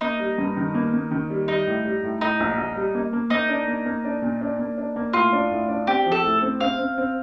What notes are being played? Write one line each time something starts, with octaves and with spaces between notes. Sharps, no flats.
A#3 D#4
G3
G2
D#3
A#3
A#3
D#3
G3
G3 D#4
A2
G3
A2
A2 D#4
A#1
A#1
G3
A#3
A#3
A#3 D#4
D4
A#3
A#3
D4
A#2
D4
A#3
D4
A#3
A2 F4
D4
A2
D4
C4 G4
F3
A4
A2
C4
C4 F5
C4
C4